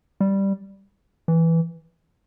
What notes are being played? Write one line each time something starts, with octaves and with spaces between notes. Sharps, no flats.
G3
E3